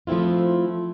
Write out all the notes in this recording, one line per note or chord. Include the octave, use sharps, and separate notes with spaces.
F3 A3 C4 E4 F4